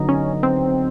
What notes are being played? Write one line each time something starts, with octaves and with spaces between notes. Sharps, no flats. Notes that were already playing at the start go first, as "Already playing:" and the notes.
Already playing: D3 F#3 B3 D#4
C#4
C4